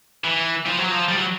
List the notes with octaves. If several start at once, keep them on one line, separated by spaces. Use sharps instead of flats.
E3
F3
F#3
F3
G3
F#3